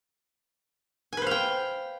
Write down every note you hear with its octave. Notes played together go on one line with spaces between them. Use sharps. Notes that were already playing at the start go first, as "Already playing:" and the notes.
B4 C5 F5 G5 G#5